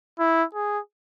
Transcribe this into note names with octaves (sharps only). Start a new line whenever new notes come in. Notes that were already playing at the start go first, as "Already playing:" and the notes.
E4
G#4